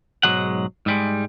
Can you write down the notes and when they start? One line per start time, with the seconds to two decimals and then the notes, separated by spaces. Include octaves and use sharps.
0.23 B1 G#2 F#3 G#3 F#5
0.86 G#2 G3 G#3